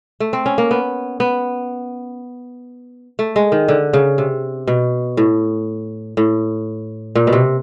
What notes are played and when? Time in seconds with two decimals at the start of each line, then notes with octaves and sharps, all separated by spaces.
0.20 A3
0.33 C4
0.46 C#4
0.58 A#3
0.71 B3
1.20 B3
3.19 A3
3.36 G#3
3.52 D#3
3.68 D3
3.93 C#3
4.18 C3
4.67 B2
5.17 A2
6.17 A2
7.15 A#2
7.27 B2
7.33 C3